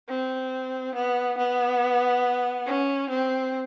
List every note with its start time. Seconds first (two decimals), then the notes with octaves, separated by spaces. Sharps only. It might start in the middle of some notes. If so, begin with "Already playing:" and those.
0.09 C4
0.95 B3
1.38 B3
2.66 C#4
3.10 C4